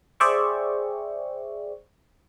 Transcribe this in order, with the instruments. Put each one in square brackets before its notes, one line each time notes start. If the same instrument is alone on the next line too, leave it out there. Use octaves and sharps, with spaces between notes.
[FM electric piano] G#4 C5 D5 E5 G5 C#6